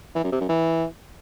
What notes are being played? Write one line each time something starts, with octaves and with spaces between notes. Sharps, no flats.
E3
F#2
C3
F#2
E3